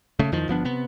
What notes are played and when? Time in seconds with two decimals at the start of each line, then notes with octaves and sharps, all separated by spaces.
0.19 C#3 A3
0.32 E2 D#3 F3
0.48 G1 F3 B3 D4
0.65 C3 B3